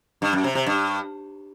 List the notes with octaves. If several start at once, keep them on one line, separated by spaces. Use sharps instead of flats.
G2
F#2
C3
C3
G2